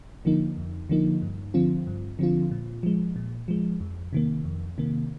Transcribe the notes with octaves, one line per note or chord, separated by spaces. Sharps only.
D3 F3 A#3 D#4
F2
D3 F3 A#3 D#4
G2
D3 F3 C4 F4
G2
D3 F3 C4 F4
A#2
F3 G#3
A#2
F3 G#3
F2
C3 D#3 A#3
F2
C3 D#3 A#3